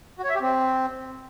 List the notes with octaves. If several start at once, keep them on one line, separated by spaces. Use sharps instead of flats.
F#4
C#5
E5
G4
C4